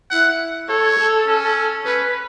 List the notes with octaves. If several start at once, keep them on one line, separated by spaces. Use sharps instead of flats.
E4 F#5
A4 C#5
A4
C#4
C#4 B4